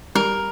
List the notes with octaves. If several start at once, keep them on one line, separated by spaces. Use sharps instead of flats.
G3 A#4